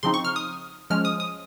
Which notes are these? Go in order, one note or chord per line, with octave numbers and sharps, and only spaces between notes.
C#3 F3 C4 D#4 C6
C#6
F6
D#6
F3 G#3 C#4 F6
D#6
D#6